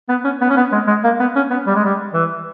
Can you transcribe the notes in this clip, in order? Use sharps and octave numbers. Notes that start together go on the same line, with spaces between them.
B3
C#4
B3
C#4
B3
G#3
G#3
A#3
B3
C#4
B3
G3
G#3
G3
E3